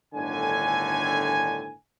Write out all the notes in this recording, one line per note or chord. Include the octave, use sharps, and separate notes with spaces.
G1 A2 D3 D#3 G#5